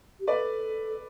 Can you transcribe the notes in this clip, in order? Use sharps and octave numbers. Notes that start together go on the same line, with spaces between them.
G4
A4 B4 D5